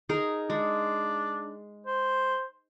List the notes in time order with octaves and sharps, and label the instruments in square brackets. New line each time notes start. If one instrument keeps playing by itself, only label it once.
[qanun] D#4 G#4 A#4
[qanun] G#3 [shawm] D4
[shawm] C5